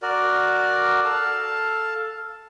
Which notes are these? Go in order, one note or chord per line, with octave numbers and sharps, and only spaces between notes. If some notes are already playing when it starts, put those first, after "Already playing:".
F#4 A#4 D5
A4 F5 A5